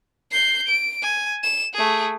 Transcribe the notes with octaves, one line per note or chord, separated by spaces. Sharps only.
G6 C7
D7
G#5
E7
A3 G#4